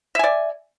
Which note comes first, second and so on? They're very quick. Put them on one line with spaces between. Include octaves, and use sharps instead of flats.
E5 G#5 D5